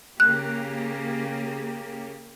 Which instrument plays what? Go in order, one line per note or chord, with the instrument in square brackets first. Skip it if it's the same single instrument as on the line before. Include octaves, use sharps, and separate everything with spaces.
[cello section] C#3 A#3 G4 [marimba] F#6